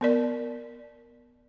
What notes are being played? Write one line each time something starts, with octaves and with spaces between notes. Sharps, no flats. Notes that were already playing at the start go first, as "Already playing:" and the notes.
B3 A#4 D5